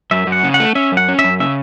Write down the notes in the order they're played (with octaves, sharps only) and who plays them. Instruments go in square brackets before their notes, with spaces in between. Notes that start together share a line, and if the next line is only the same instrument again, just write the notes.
[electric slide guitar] F#2 [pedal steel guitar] E5
[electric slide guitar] F#2
[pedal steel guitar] F#5
[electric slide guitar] C#3
[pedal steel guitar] F#5
[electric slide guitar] A3
[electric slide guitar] C#4 [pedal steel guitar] E5
[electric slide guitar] F#2
[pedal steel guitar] F#5
[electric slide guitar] C#4
[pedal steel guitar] E5
[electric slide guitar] F#2
[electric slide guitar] C#3 [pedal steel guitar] E5